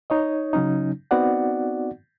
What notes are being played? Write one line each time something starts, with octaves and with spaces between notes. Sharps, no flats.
D#4 C#5 D#5
C#3 F#3 C#4 D#4
B3 C4 D#4 F#4 D5 F#5